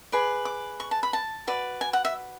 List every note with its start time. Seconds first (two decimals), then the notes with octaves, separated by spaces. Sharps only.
0.12 G#4 B4 D5
0.45 D6
0.80 C#6
0.91 A5
1.03 B5
1.13 A5
1.47 F#4 B4 D5
1.81 G#5
1.93 F#5
2.05 E5